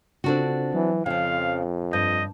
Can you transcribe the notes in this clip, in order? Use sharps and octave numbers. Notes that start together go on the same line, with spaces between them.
C#3 C4 D4 F4 F#4 A4
E3 F#3
F2 C#3 F3 F5 G5
G2 D#5 G6